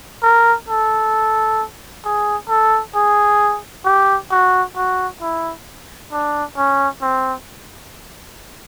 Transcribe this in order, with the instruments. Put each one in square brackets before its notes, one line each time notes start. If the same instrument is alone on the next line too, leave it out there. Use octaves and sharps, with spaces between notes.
[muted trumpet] A#4
A4
G#4
A4
G#4
G4
F#4
F#4
E4
D4
C#4
C4